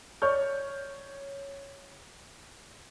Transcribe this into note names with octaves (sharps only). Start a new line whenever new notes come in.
C#5 D5 C#6 F6 G6